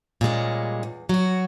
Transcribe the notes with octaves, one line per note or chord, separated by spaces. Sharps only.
A#2 G3 G#3 C#4
E2
F#3 F#4